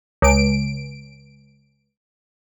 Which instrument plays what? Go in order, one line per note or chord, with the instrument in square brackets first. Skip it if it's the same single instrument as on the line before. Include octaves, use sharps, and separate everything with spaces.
[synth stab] C#2 D7